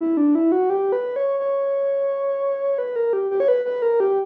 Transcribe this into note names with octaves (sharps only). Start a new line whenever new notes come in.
E4
D4
E4
F#4
G4
B4
C#5
C#5
B4
A#4
G4
G4
C#5
B4
B4
A#4
G4